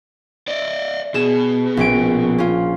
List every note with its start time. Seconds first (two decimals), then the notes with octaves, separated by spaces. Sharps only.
0.48 D5 D#5
1.14 B2 G#4 E7
1.77 A#1 C#4 D7
2.38 C#4 F4